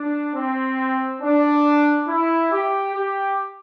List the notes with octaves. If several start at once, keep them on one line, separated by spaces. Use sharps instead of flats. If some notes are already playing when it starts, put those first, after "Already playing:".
Already playing: D4
C4
D4
E4
G4
G4